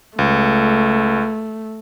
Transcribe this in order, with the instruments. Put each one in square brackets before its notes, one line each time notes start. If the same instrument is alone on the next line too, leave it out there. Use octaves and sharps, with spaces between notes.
[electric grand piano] C#2 [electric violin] A3